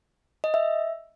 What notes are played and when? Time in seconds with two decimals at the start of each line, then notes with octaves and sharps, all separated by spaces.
0.44 D#5
0.54 E5